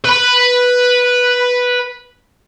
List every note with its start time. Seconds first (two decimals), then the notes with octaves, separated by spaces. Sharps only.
0.05 B4 B5